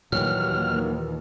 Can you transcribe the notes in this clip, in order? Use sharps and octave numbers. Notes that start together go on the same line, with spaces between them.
D#2 A#2 E3 F#3 G3 F6